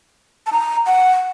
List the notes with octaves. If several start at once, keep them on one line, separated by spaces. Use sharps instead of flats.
A5
A#5
F#5